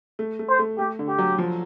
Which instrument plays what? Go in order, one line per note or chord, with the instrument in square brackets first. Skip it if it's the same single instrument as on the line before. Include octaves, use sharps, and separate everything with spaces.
[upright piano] A3
A3
[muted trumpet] C5
[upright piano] A3
[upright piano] A3 [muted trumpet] G4
[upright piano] D3
[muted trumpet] G4
[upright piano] F#3
F3